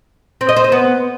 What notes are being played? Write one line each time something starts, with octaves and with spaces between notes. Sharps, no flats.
C4
D#5
C5
D#5
B3